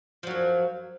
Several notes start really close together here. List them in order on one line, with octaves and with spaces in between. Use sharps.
F3 F#3 F#2